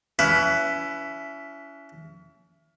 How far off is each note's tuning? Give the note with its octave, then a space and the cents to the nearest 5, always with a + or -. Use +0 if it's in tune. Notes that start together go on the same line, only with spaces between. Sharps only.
C#4 +35 E4 +20 B4 +0